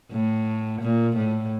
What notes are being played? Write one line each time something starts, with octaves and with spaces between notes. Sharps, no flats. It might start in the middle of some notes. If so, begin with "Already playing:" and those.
A2
A#2
A2